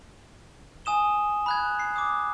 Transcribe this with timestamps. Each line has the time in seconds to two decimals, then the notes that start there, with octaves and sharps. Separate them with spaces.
0.85 G#5 D#6 E7 G7
1.46 B5 F#6 G#6
1.79 C7
1.96 D6 D#6